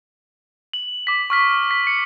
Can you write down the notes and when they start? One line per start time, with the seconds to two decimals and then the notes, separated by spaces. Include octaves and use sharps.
0.73 F#7
1.07 D6 B6
1.30 C#6 F6 B6
1.71 B6
1.87 C#7